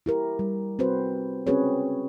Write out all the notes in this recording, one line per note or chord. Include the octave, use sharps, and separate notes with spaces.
E4 G4 A#4
G3
C4 F#4 B4 C5
C4 C#4 F#4 G#4 B4 C#5